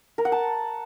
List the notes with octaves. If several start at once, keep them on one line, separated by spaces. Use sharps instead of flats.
A#4
F#5
A5